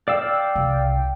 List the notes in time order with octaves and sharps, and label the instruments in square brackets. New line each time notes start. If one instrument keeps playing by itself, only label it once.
[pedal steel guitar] D5 F5 E6 [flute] G5
[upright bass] C2